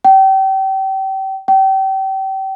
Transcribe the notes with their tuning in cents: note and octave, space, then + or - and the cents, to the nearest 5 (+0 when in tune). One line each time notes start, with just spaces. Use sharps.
G5 -30
G5 -30